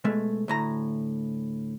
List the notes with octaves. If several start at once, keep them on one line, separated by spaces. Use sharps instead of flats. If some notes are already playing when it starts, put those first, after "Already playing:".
B2 G#3 A3
D2 A2 A#5